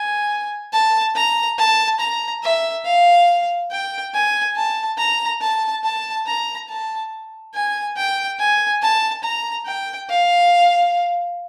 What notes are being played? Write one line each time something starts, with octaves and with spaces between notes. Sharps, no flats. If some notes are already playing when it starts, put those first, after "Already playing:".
Already playing: G#5
A5
A#5
A5
A#5
E5
F5
G5
G#5
A5
A#5
A5
A5
A#5
A5
G#5
G5
G#5
A5
A#5
G5
F5